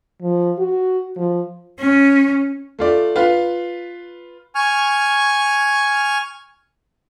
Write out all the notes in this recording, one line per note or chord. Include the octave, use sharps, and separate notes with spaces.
F3
F#4
F3
C#4
A3 F4 D5
F4 B4 F5
G#5 C#6 F6